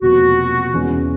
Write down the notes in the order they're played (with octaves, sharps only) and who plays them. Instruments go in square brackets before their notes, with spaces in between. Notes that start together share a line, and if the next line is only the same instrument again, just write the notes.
[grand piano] E1 E2 C3 F3 A#3 [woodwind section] F#4
[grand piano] E2 C#3 E3 G#3 C#4